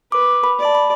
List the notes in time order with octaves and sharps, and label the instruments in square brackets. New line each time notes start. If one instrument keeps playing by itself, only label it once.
[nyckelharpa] B4 [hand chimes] D6
[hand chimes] B5
[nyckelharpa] D5
[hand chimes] A5
B5